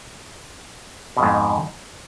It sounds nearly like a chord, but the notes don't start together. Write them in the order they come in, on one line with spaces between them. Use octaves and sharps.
B2 F2 G#2